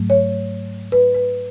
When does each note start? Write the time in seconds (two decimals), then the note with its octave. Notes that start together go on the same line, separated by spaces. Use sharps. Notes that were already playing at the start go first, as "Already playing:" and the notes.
Already playing: G#2 F#3 A3
0.10 C#5
0.92 B4
1.15 B4